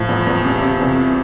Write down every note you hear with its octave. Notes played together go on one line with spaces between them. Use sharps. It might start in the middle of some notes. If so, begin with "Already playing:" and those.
Already playing: A2 F3
E2
E2
C3
C3
E2